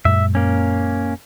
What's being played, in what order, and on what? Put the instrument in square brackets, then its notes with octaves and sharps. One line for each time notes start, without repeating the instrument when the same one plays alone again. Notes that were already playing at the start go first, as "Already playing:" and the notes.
[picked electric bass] F#2 A#2 G#3 [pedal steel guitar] E5
[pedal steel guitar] A#3 C#4